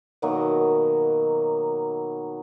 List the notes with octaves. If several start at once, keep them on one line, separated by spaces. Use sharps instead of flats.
B2 D#3 F#3 A#3